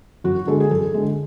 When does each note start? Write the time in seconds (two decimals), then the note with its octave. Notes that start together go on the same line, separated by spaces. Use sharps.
0.24 F#2 F#4
0.47 D3 G#3 A4
0.60 G#4
0.71 F#2 A4
0.94 D3 G#3